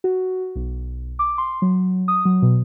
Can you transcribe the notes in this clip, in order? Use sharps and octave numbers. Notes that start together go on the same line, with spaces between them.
F#4
B1
D6
C6
F#3
D#6
F#3
B2